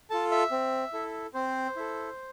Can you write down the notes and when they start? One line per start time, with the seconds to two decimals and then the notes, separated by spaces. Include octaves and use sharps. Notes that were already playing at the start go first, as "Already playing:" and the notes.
0.10 F4 A4 A5
0.31 E5
0.51 C4
0.93 E4 A4
1.34 C4 C5
1.76 E4 A4